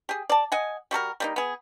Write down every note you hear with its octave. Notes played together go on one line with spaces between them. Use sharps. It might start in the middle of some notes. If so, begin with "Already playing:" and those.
G4 G#4
D5 A5
D#5 F#5 G#5
G3 F#4 A4 A#4
G3 A#3 D#4
B3 G#4